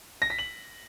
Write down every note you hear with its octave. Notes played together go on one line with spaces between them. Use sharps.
A#6
B6
F#7